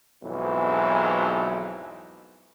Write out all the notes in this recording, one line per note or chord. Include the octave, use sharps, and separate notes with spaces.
B1 F2 G#2 E3 F#3